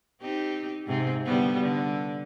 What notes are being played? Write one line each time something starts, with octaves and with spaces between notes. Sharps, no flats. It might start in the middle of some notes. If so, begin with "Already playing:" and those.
C4 D#4 G4
G#2 C3 C4
D3 G3 B3
D3